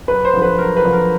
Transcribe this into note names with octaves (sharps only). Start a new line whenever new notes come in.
F#2 B4
C5
D3 F3
B4
F#2 A#4
B4
D3 F3
A#4